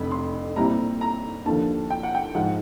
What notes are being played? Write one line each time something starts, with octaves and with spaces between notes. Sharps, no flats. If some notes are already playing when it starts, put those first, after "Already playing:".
Already playing: F1 F2 D3 B5
C6
A#2 G3 C4 E4 A#5
A#5
D#2 D3 F3 A5
G5
F#5
G5
G#2 F3 F#5